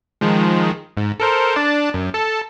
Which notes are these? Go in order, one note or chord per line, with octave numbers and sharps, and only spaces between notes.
D#3 F3 G#3
G#2
A4 A#4 C5
D4 D5 A5
F#2
A4 A5